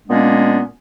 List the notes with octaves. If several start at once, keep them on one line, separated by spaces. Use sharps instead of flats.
A#2 G#3 A#3 B3 C#4 D4